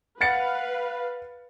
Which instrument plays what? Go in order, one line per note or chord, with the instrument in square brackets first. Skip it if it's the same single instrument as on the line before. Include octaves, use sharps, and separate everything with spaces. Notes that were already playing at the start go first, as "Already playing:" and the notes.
[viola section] B4 F5 [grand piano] F#5 A6 C#7